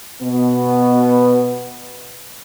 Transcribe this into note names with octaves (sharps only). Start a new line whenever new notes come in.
B2 B3